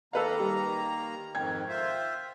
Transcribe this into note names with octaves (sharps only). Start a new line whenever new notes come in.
D#3 A#3 A4 B4 F5 A#5
G3
F2 G#2 D#3 G5 G#6
F4 C5 E5